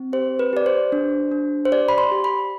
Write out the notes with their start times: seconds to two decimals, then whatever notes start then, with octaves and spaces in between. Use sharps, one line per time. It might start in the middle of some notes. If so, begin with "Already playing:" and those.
Already playing: C4
0.13 G4 C5
0.39 B4
0.53 G4 D5
0.66 C5
0.92 D4
1.32 D4
1.65 C5
1.72 G4 D5
1.88 B5
1.98 C6
2.12 G4
2.24 B5